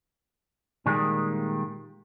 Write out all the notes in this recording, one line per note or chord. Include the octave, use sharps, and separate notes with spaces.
A#2 D#3 G3 G#3 A#3